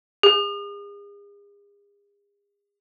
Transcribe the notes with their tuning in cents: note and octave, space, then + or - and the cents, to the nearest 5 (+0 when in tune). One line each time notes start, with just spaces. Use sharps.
G#4 -40